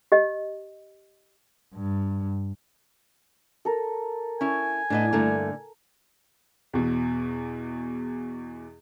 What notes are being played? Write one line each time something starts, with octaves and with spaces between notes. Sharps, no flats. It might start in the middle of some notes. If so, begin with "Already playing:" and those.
G4 D#5
G2
A4 A#4
C#4 E4 G#5
A2 B3 D4 B4 D#5
G2 D3 A3 A#3
E2 B2